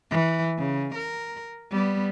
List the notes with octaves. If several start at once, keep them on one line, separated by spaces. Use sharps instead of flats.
E3
C#3
A#4
G3 B3